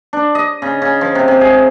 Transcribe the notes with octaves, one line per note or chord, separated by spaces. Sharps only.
D4
D#5
C#3
C#3
F3
C3
C3
G#4